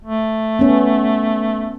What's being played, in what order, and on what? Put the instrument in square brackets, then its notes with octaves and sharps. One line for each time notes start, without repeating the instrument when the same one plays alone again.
[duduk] A3
[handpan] B3 C#4